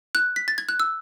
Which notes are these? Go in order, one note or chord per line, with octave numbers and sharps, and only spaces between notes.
F#6
B6
A6
G#6
F#6
E6